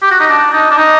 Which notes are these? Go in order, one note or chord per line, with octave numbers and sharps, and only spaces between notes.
G4
F#4
D#4
D4
D#4
D4
D#4